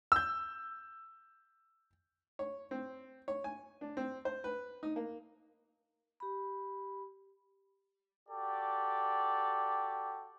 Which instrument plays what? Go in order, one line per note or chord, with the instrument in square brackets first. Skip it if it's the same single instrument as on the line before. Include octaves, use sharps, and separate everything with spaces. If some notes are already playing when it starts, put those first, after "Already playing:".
[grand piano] E6 G6
[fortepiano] C#5
C4
C#5
G#5
D4
C4
C5
B4
D#4
A#3
[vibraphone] G4 B5
[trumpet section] F#4 G4 A4 D5